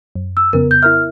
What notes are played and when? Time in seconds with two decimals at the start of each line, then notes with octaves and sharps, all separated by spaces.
0.15 F#2
0.37 E6
0.53 F2 C#3 B3 A#4
0.71 G6
0.83 E4 A#4 E5 F6